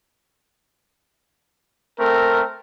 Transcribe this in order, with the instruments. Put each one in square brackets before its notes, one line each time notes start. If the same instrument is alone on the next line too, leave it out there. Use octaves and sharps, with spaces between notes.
[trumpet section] A3 C4 A#4